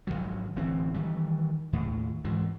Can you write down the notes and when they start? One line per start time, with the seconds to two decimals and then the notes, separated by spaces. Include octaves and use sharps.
0.07 G#1 D#2 F3 F#3
0.56 D1 E3 C4
0.94 D#3 E3 G3
1.73 D#2 A2
2.24 G#2 E3 F3